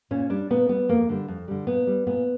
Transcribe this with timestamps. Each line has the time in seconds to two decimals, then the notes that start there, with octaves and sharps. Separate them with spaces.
0.11 A#2 C#4
0.30 G3 D4
0.50 A#2 B3
0.69 G3 B3
0.89 F2 A#3
1.09 D3 G3
1.28 F2
1.48 D3 G3
1.67 A#2 B3
1.87 G3
2.07 A#2 B3